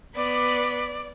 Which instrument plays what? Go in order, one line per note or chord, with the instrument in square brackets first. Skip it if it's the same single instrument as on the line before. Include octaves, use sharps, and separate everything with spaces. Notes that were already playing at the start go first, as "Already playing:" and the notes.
[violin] B3 B6 [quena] D5